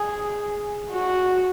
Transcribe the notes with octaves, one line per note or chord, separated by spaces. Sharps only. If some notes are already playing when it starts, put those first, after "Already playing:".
Already playing: G#4
F#4